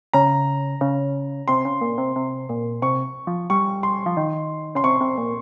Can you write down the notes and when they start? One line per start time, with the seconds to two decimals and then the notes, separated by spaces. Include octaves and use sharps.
0.13 C#3 A#5
0.81 C#3
1.48 C3 C6
1.65 C#3
1.81 A#2
1.98 C3
2.16 C3
2.49 A#2
2.82 C3 C#6
3.27 F3
3.50 G3 C#6
3.83 C6
4.06 F3
4.17 D#3
4.75 C#3 C6
4.84 C3 C#6
5.01 C3
5.18 A#2